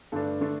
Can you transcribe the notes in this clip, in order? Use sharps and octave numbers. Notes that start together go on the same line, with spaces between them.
G2 D3 A3 D4 A4
D3 A3 D4